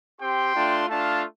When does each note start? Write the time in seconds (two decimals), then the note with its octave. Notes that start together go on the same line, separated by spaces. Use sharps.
0.20 C4 G4 G5 C6
0.55 A3 D4 F4
0.89 A3 D4 F4 F5 A5